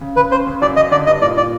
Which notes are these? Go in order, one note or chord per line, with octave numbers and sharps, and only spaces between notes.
C#3
C#3 B4
C#4 C5
C#3
F#2 D5
C#3 D#5
D3 D5
G2 D#5
A#2 D5
A#2 D5